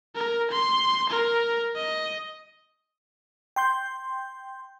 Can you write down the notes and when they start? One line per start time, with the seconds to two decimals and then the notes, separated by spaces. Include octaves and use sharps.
0.15 A#4
0.51 C6
1.10 A#4
1.76 D#5
3.56 G5 C6 G6